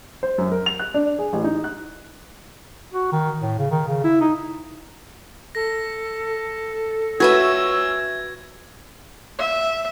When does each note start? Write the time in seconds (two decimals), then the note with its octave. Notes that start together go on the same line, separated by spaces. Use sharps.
0.23 C5
0.38 F#2
0.52 A#4
0.66 F7
0.79 F#6
0.94 D4
1.19 G#4
1.33 A1
1.44 D#4
1.64 F#6
2.93 F#4
3.12 D#3
3.41 A2
3.58 C#3
3.71 D#3
3.87 C#3
4.04 E4
4.21 D#4
5.55 A4 A#6
7.20 C#4 F#4 B4 E5 E6 G#6
9.39 E5